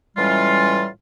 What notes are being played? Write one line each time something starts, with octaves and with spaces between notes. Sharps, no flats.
A2 E3 G3 G#3 C#4 F4